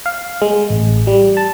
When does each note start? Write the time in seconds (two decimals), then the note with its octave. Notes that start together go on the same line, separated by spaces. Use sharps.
0.06 F5
0.42 G#3
0.70 A1
1.07 G3
1.37 A5